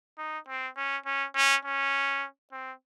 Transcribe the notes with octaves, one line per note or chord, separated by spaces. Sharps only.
D#4
C4
C#4
C#4
C#4
C#4
C4